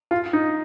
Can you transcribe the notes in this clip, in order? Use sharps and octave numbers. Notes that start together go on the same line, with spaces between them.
F4
D#4